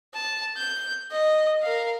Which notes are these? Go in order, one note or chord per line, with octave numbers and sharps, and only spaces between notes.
A5
G6
D#5
A#4 F5